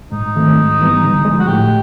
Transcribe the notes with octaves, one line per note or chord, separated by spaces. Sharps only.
G#2 D#4
D#3 F#3 A3 C4
G#2
E3 G3 B3
D3
F3 G#3
F#4
A2 G4